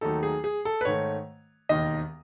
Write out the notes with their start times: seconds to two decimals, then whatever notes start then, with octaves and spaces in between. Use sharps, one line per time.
0.01 D#2 D#3 F#3 A3 D#4 A4
0.23 G#4
0.44 G#4
0.65 A4
0.81 B4
0.85 G#2 D#3 A3 C#5
1.69 E1 D#2 D#3 D#5